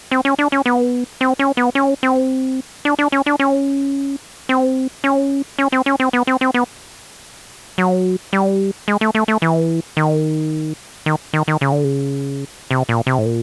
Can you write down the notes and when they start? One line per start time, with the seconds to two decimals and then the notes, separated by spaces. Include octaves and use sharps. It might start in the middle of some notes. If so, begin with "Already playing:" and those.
0.11 C4
0.25 C#4
0.39 D4
0.52 C#4
0.66 B3
1.21 C4
1.39 C#4
1.57 B3
1.75 C#4
2.03 C4
2.85 D4
2.99 D4
3.12 C#4
3.26 D4
3.39 C#4
4.49 C4
5.04 C#4
5.59 C#4
5.72 C4
5.86 C#4
6.00 C4
6.13 B3
6.27 C4
6.41 C4
6.54 B3
7.78 F#3
8.33 G3
8.88 G#3
9.01 A3
9.15 A3
9.28 A3
9.42 E3
9.97 D#3
11.06 D#3
11.33 D#3
11.48 D#3
11.61 C#3
11.72 D3
11.84 C#3
12.71 C3
12.89 A#2
13.07 C3
13.18 A2
13.26 A#2